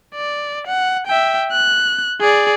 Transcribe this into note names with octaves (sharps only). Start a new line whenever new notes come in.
D5
F#5
E5 G5
F#6
G#4 D5